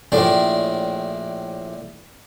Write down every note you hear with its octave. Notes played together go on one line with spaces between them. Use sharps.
A#1 A2 D4